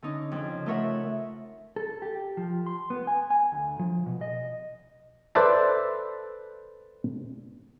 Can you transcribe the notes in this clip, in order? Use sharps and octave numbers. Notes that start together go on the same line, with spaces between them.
D3 C#4 D#4
F2 C#3
A3 F4 A#4 C#5 E5 F#5
A4
G4
F3
C6
B3
G#5
G#5
D2
F3
B2
D#5
A4 B4 C5 D5 E5 A5